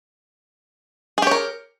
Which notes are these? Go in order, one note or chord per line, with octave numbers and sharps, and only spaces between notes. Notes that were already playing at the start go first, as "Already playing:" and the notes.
G4 G#4 A#4 C#5